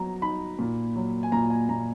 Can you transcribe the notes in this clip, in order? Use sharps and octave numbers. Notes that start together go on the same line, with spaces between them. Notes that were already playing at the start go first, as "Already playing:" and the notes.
Already playing: F#3 B3 A#5
D#4 B5
A#2
F#3
G#5
A#2 A#5
G#5
A#2 A#5